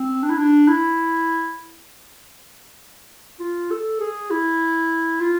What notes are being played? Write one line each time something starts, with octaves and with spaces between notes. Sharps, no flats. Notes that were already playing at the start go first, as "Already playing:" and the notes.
Already playing: C4
D4
E4
D4
E4
F4
A4
G#4
E4
F4